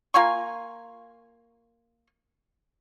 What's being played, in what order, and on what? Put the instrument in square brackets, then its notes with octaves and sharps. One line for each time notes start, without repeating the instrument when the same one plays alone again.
[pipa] A#3 F4 G#5 C#6